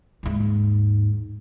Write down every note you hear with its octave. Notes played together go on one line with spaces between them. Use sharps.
D#2 G#2